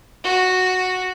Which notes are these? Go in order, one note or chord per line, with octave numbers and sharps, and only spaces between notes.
F#4